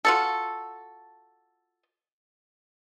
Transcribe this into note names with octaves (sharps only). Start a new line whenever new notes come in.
F4 F#4 A4